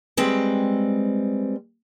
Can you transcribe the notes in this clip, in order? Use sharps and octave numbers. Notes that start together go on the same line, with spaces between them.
G3 G#3 C4 B4 G5